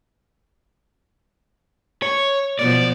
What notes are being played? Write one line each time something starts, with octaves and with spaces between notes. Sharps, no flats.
C#5
B2 F3 D5